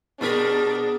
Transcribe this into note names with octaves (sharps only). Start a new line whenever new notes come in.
B2 G3 B3 D4 G#4 A#4 B6